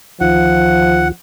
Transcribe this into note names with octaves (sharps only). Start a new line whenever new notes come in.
D2 D#3 F3 F4 F#5